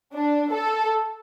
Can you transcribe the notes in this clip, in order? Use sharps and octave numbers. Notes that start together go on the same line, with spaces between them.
D4
A4